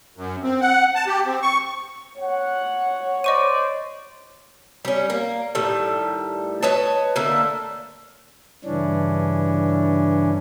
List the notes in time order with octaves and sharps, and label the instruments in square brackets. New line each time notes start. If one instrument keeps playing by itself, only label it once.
[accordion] F#2
C4
F#5
A5
G4
C4
C#6
[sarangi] C#5 [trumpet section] F#5
[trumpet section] C5 D5 [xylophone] D#5 C#6 D#7
[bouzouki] G3 C#4
A#3
A2 D#3 G3 A4
B4 C#5 D#5 A5
D3 A3 A#3
[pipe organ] G2 C#3 E3 C#4 D4